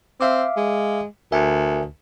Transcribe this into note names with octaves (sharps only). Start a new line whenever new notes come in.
C4 E5 F5 D6
G#3
D2 A#4 E5 G#5